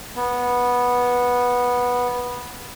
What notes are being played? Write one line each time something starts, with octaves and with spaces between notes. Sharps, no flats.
B3